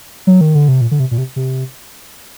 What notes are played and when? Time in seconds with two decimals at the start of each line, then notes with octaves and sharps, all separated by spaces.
0.27 F#3
0.41 D#3
0.55 D3
0.68 C3
0.81 A#2
0.91 D3
1.00 C3
1.11 A#2
1.18 C3
1.36 C3